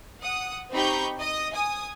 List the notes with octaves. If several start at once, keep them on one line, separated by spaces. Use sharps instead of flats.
F#5 D#6
C4 D#4 G4 B5 C#6 G6
D#5 D#6
G#5 D#6